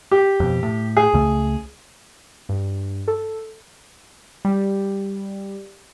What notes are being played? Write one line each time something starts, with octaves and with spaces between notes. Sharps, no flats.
G4
F2 B2
A2
G#4
C#2 C#3 A3
G2
A4
G3